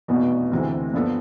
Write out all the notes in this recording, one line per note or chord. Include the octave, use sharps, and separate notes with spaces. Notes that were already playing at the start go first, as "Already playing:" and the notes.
F1 E2 B2 B3
D2 C3 E3 A3
G2 F3 B3 D4 A4